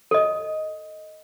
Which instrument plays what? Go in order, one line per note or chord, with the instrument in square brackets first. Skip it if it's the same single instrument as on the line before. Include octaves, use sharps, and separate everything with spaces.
[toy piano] A4 D#5